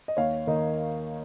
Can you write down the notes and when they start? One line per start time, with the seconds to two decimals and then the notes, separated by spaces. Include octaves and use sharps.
0.08 D#5
0.17 D#2 C#5 F5
0.47 D#3 A#3 D#4